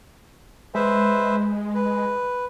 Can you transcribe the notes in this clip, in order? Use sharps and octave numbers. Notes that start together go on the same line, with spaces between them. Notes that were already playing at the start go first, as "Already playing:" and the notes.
G#3 B4 C5 E5
B4